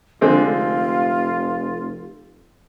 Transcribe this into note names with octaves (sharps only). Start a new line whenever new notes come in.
F1 D3 G#3 C4 F4